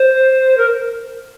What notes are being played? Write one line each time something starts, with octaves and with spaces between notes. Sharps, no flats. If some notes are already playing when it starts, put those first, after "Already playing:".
Already playing: C5
A#4